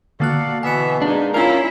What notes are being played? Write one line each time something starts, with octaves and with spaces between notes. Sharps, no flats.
D3 A#3 F#4 A4 D5 F5 F#6
B2 E3 B3 E5 G#5 C#7
G#3 A#3 D4 D#4
C#4 E4 F4 A#4 E6 C7